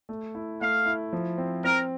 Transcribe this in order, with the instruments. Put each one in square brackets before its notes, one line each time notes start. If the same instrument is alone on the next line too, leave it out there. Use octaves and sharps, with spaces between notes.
[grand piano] A3
E4
[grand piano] A3 [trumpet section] F5
[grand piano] E4
F3
C4
[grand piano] C4 [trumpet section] A#4